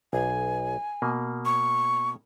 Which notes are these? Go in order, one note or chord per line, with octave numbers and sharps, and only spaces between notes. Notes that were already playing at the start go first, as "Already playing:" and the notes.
B1 G#5
B2 A#3
C#6